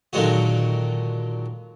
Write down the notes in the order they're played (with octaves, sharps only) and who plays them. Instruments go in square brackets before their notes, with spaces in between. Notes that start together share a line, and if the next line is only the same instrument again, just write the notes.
[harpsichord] A#2 D3 D#3 F#3 G#3 F#4